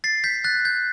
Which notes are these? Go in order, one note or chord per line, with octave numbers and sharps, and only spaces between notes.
A6 C7
G6 B6
F#6 A6
G6